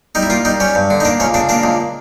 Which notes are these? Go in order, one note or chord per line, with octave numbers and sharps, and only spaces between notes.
G3 D#4
E4
A#3 F4
G3 D#4
G3 C#4
G2
D3
D#4
A#3 D4
C#2 C#4
C#3 D4
A#3 D4
C#2